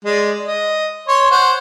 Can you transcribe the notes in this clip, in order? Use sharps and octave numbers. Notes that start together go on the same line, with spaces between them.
G#3 D5
D#5
C#5 C6
C5 F#5